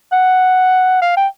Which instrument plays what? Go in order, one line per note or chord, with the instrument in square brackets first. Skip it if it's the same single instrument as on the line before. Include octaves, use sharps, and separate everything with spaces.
[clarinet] F#5
F5
G5